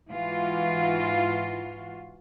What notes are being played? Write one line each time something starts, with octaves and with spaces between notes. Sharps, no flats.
G#2 E3 F4 F#4